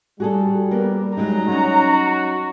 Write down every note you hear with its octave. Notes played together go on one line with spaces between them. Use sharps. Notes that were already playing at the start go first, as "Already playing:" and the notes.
G3 F#4 G#4 A4
A#3 B3 A#4
F#3 G#3 D#4 A#5
F#3 C#4 D#4 F#4